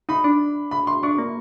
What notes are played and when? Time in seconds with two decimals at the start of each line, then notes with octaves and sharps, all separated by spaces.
0.09 D#4 B5
0.24 D4
0.71 B5
0.87 C6
1.03 D4 C#6
1.19 A#3